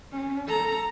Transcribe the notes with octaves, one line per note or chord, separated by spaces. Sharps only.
C#4
A4 A#5